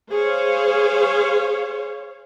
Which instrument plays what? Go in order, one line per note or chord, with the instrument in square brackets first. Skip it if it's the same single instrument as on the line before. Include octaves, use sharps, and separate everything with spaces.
[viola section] G#4 C5 C#5 F5